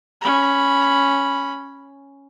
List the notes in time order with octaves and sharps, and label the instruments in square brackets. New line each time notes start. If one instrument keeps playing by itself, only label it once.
[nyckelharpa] C#4 B5